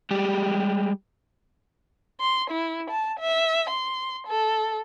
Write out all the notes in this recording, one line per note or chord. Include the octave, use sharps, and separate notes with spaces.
G3 G#3 G4
C6
E4
A5
E5
C6
A4